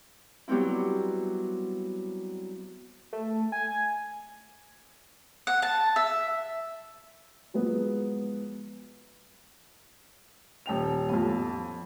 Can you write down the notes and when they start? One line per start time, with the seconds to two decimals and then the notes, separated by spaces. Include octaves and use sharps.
0.48 F#3 G3 B3 C4 E4
3.13 A3
3.52 G#5
5.47 F#5
5.62 A5
5.96 E5
7.54 F3 F#3 G#3 B3
10.66 D#1 G5 F7
11.09 A1 F2 B3